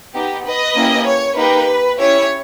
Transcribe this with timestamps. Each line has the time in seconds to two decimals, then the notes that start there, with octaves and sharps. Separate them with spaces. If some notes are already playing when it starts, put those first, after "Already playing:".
0.14 B3 D#4 G4
0.45 B4 D#5
0.75 A#3 C#4 E4 G4
1.05 C#5
1.36 A#3 D#4 G4 B4
1.97 C#4 E4 G4 C#5